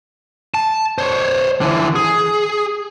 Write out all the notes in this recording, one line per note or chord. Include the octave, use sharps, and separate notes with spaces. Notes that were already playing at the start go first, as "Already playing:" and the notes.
A5
C5 C#5
D3 E3
G#4